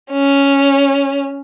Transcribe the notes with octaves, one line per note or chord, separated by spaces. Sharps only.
C#4